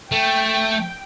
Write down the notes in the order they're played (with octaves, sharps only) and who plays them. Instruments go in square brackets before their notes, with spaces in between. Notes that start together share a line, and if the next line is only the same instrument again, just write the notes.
[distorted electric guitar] A3 [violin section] G5